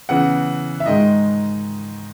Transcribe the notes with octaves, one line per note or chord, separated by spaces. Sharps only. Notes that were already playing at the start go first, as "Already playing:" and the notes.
C#3 E3 B3 F#5
E5
G#2 D#3 G#3 D#5